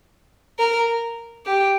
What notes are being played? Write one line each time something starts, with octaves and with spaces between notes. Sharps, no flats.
A#4
G4